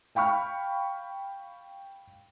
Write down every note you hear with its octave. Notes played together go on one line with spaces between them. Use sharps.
F5 G5 B5 C#6 F6